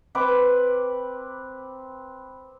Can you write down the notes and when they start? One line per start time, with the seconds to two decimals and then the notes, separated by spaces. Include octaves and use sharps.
0.15 C4 B4 D6